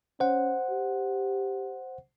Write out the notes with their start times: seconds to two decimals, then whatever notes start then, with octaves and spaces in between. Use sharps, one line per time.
0.20 C#4 C5 F#5
0.70 G4